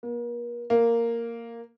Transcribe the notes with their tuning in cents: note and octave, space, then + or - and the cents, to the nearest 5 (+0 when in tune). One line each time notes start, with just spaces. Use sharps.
A#3 +40
A#3 -5